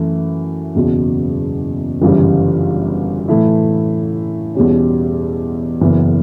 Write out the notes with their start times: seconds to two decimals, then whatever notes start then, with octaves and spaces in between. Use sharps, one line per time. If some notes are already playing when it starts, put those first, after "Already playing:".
Already playing: F#2 E3 A3
0.75 F#1 E2 B2 F#3
2.02 G1 F#2 C#3 E3 G3
3.28 A2 E3 A3 E4
4.55 E2 B2 G3 C#4
5.81 F#1 F#2 E3 B3